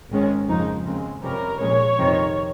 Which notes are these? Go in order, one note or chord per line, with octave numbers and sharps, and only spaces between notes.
G#1 G#2 D#3 G#3 C#4
F2 C#3 F3 G#3 D#4
D#2 C#3 G#3 C4
F2 C3 G3 C#4 A#4
A#1 A#2 F3 G#3 C#4 C#5
F2 C3 D#3